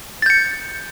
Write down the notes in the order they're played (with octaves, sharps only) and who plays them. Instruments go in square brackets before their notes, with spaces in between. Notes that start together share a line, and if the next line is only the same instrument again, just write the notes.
[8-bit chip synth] A6
G6
C#7